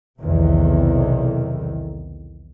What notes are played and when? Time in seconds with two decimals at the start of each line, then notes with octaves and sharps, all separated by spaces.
0.20 B1 E2 C3 D#3